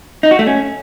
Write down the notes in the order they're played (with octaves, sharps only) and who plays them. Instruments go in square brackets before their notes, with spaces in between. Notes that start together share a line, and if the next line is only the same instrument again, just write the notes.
[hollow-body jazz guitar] D#4
F#4
A3
C#4